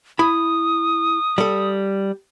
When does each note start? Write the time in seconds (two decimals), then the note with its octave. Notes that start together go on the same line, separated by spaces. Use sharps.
0.19 E4 B5 D#6
1.38 G3 A4